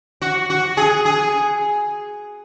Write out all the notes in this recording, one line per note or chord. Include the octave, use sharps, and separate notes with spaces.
F#4
F#4
G#4
G#4